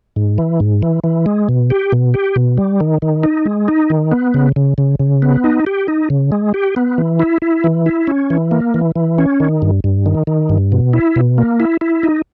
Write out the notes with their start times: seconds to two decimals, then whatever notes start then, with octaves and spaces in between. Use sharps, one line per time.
0.16 G#2
0.38 E3
0.60 G#2
0.83 E3
1.04 E3
1.26 G#3
1.49 B2
1.70 G4
1.92 B2
2.14 G4
2.36 B2
2.58 G3
2.80 D#3
3.02 D#3
3.24 D#4
3.46 G#3
3.68 D#4
3.90 D#3
4.12 B3
4.34 C#3
4.56 C#3
4.78 C#3
4.99 C#3
5.22 B3
5.44 D#4
5.67 G4
5.88 D#4
6.10 C#3
6.32 G#3
6.54 G4
6.76 B3
6.98 E3
7.20 E4
7.42 E4
7.64 E3
7.86 E4
8.07 C#4
8.30 E3
8.51 A#3
8.74 E3
8.96 E3
9.18 C#4
9.40 D#3
9.62 G2
9.84 G2
10.06 D#3
10.27 D#3
10.49 G2
10.72 B2
10.93 E4
11.16 B2
11.38 A#3
11.60 E4
11.81 E4
12.03 D#4